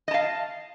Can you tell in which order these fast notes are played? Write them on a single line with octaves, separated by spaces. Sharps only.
D#5 A5 F5